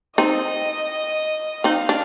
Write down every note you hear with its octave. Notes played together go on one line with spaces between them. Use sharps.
C4 D#4 D#5
C4 D#4 F5
D4